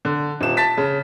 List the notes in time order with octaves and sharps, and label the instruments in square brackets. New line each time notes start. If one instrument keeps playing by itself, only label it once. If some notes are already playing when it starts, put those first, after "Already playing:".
[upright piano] D3
D#1 E7
A5 A6 B6
C#3